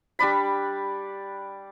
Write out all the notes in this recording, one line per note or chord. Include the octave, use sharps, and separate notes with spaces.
G3 D4 D5 B5